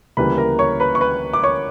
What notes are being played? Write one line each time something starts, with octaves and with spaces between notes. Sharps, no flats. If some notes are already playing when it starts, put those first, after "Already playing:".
D2 C#3 E3 G3 A#3 B4 B5
A#4 A#5
C#5 C#6
B4 B5
C#6
B4 B5
D6
C#5 C#6